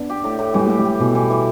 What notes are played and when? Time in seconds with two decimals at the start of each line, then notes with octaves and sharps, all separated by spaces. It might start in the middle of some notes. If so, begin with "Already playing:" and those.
Already playing: B3 D4
0.10 G4
0.24 A2
0.39 A2
0.54 E3 G3
0.67 A3 G4
0.79 G3
0.85 G4
1.00 B2 E3
1.15 E3
1.30 E3